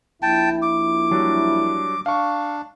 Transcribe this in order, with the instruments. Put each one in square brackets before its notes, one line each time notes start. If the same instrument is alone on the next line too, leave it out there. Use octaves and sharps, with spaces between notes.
[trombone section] A#1 E4 [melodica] G5 A5
[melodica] D6
[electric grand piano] F#3 G3 D4
[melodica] D4 [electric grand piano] F5 C#6